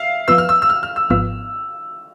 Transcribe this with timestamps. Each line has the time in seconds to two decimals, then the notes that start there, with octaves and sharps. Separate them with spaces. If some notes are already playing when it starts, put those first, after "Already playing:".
Already playing: E5 F5
0.28 F3 B3 F4 B4 E6
0.38 F6
0.49 E6
0.62 E6
0.70 F6
0.83 F6
0.96 E6
1.10 G#1 G#2 F3 B3 F4 E6